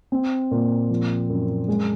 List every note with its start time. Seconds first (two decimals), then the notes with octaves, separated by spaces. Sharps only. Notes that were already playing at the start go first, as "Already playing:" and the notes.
0.12 C4
0.51 A#2
0.91 F3
1.29 F#2
1.68 G#3